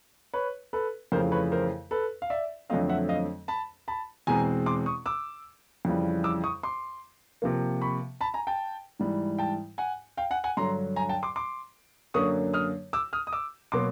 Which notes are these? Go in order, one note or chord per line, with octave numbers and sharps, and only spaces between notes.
B4 C#5
A4 B4
F2 C#3 E3 A3 A#4 C5
B4 C#5
A#4 C5
A4 B4
F5
D5 E5
F2 D3 F#3 A3 C4 D#5 F5
E5 F#5
D#5 F5
A5 B5
A5 B5
E2 B2 G#3 C4 G#5 A#5
C6 D6
C#6 D#6
D6 E6
F2 C#3 E3 G3
D6 E6
C#6 D#6
C6 D6
C3 F3 A#3
B5 C#6
A5 B5
G#5 A#5
G5 A5
G#2 E3 G3
G5 A5
F#5 G#5
F5 G5
F#5 G#5
F#5 G#5
G2 D3 F#3 A#5 C6
G#5 A#5
G5 A5
C6 D6
C6 D6
F#2 D3 F#3 A#3 C#6 D#6
D#6 F6
D6 E6
D#6 F6
D#6
D6 E6
B2 F#3 A#3 C6 D6